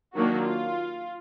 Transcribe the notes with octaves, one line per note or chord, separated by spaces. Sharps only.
D#3 F#3 A#3 D4 F#4
F4